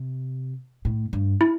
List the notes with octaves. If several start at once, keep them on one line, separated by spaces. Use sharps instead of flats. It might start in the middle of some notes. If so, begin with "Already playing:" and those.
Already playing: C3
A2
G2
E4